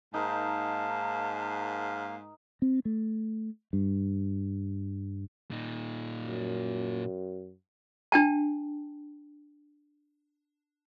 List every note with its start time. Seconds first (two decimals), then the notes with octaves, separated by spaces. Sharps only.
0.14 G#2 A#3 D#4 A#4 F5 A5
2.62 C4
2.85 A3
3.73 G2
5.51 A#2 D#4
6.21 F#2
8.12 D4 G5 A5